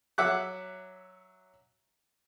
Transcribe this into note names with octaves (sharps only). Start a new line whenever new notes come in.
F#3 E5 F#5 D6 F#6